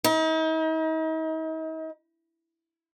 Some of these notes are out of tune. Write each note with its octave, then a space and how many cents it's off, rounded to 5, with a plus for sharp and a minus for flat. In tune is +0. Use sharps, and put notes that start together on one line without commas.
D#4 +40